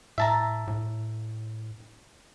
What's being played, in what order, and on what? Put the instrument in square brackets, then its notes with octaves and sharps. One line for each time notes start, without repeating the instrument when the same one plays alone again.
[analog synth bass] A2 [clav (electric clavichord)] E5 A5 A#5
[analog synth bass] A2